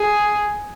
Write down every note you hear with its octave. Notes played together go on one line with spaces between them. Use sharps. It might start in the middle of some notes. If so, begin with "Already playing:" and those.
Already playing: G#4